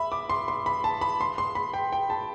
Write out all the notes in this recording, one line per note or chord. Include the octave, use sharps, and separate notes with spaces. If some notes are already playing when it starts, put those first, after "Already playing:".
Already playing: E5 B5
D6
C6
C6
B5
A5
B5
C6
C6
B5
G5
G5
A5